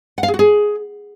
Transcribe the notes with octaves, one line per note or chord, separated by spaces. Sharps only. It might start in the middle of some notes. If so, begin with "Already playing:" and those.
F#5
F5
G#4
F#4
G#4